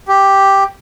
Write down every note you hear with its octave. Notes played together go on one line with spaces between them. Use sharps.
G4